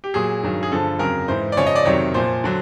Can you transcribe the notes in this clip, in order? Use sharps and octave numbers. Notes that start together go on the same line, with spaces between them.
G4
A#2 F#3 G#4
G2 D#3 F#3
G#4
G2 D3 F3 A4
F2 C#3 F#3 A#4
G#2 E3 C5
D5
F#2 C#3 F3 C#5
D#5
D5
F2 C3 D#3 F#3 C#5
A#2 F3 C5
D3 F#3